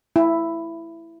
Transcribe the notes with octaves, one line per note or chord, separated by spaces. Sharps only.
E4